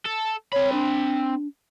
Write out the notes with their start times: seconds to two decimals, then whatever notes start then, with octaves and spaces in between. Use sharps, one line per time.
0.05 A4
0.53 C4 C#5 B5
0.72 D4